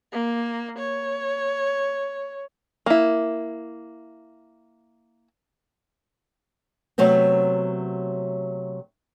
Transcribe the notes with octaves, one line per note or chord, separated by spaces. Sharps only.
A#3
C#5
A#3 E4
C3 F#3 A3 B3 C4